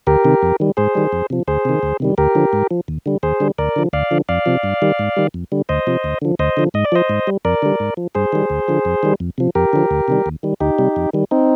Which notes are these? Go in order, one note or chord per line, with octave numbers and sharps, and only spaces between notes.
D2 G4 A#4
C3 D#3
F2
D#3 G3
G#2 G#4 C5
D#3 G3
F2
C3 F3
D2 G#4 C5
C3 D#3
D2
C3 D#3 G3
D2 G4 A#4
D3 F3
G#2
F3
D#2
D3 G3
D#2 G#4 C5
D3 G3
D2 A#4 D5
D3 F3
D2 D5 F5
D3 F3
F2 D5 F5
C3 F3
G2
D#3 G3
G#2
D#3 G3
F2
D3 G3
D2 C5 D#5
C3 F3
D2
D3 F3
D2 C5 D#5
D3 F3
G#2 D#5
D5
F3 C5 D#5
G#2
G3
F2 A#4 D5
D3 G3
G#2
F3
G2 G#4 C5
D#3 G3
D2
D3 F3
F2
D#3 G3
F2
C3 F3
F2 G4 A#4
D3 F3
D2
C3 D#3 G3
D#2
D#3 G3
D2 D#4 G4
C3 G3
F2
D#3 G3
C4 D#4